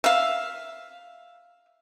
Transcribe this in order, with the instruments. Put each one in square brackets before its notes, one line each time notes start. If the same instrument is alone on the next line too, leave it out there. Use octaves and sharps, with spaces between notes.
[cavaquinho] E5 F5